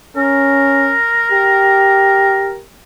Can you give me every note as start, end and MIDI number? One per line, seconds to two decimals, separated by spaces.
0.16 0.95 61
0.16 2.61 70
1.32 2.62 67